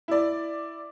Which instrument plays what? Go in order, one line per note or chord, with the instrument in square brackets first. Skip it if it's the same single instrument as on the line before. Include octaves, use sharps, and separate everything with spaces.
[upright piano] E4 D5